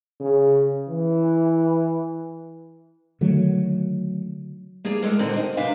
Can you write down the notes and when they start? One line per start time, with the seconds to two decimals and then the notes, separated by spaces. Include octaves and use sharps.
0.20 C#3
0.89 E3
3.21 D3 D#3 F#3 A3
4.85 A#3 D4 G#4 C#5
5.02 A2 G#3 A4 A#4 C#5
5.19 A#2 D3 D#3 C4 D4 F#4
5.33 A#4 C5 D#5
5.57 C3 F#3 D4 B4 F5